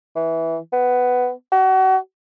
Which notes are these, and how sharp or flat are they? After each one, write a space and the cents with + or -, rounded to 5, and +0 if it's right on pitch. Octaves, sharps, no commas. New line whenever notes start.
E3 -10
B3 +10
F#4 +35